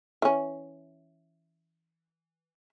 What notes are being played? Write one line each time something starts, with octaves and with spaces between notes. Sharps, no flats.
E3 C#4